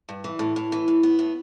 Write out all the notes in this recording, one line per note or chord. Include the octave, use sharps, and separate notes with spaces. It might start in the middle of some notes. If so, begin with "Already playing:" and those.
G2
E3
A2
A2
E3
A2
B3
A2